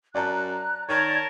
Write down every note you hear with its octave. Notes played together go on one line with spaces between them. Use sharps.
F#2 D5 A5 A#5 F#6
D#3 A#4 C#5 D5 A5 G#6